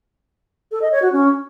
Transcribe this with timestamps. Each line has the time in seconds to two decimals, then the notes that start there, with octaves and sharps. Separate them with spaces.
0.71 A4
0.81 D#5
0.91 C#5
1.02 F#4
1.12 C#4